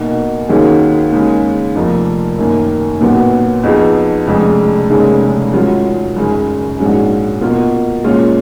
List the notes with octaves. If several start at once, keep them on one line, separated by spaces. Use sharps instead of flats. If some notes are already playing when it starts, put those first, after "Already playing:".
Already playing: B1 B2 A#3
D#2 D#3 F#3 C#4 G#4
D#2 C#3 G#3 C#4
F1 F2 F3 A#3
F#2 D#3 A#3
B1 A#2 F#3 B3
F2 F3 B3 D#4 G#4
F1 F2 C#3 G#3
F1 D#2 C#3 G#3 C#4
G#1 G#2 F#3 C#4 F4
G#1 F#2 C#3
A#1 G#2 F#3 C#4 G#4
B2 A#3 F4
A#2 G#3 C#4 F4